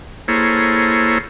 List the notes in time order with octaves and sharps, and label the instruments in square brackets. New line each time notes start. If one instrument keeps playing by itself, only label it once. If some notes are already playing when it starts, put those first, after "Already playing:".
[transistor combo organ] A#3 E4 G#4 A4 C5 C#5